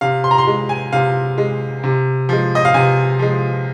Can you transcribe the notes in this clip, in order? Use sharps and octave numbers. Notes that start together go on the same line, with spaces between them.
C3 F5
C6
A#5
C6
G#3
G#5
C3 F5
G#3
C3
F3 G#3
D#5
F5
C3 G#5
F3 G#3